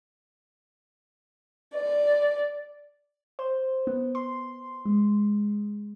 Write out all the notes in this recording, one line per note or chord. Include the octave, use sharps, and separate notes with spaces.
D5
C5
B3
C6
G#3